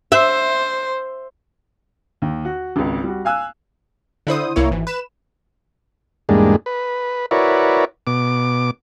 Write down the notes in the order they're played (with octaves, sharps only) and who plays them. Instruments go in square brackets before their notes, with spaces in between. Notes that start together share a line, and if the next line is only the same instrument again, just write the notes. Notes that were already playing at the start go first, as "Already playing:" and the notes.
[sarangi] C5 [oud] E5
[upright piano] D#2
F#4
G#1 C#2
G3 F#4
F5 G#5 E6 F#6
[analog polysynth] D3 E4 C5 D#6
C2 A#3 E4 C#5
G#1 E3
B4 E7
[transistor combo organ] E2 G#2 G3 G#3 A#3 D4
B4
E4 F#4 A#4 B4 C#5 D5
B2 D6